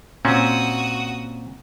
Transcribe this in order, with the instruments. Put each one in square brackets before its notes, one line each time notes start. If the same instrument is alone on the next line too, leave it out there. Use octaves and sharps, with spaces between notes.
[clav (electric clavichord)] A#2 C4 C#4 [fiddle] F#4 D#6